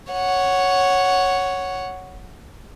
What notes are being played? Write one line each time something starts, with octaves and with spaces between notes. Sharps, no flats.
C#5 F#5